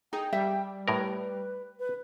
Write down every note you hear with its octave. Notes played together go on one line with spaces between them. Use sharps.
D#4 G#4 G5
G3 E5
A2 A#4 B4
B4
B4